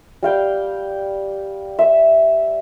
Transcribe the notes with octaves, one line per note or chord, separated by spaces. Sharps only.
G3 F5 G5
E5